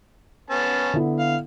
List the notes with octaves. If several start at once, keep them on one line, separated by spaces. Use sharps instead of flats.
B3 C#4 A5
D3 B3 E4
F5